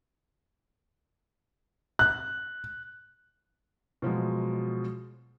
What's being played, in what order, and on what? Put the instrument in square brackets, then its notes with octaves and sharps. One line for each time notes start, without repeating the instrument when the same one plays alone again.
[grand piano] F#6
[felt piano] B2 F3 F#3 G#3